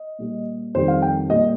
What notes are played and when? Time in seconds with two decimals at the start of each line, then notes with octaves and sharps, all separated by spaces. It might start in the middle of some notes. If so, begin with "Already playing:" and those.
Already playing: D#5
0.19 A#2 G3
0.74 F2 D#3 G3 C5
0.88 F5
1.02 G5
1.30 A#2 G3 D#5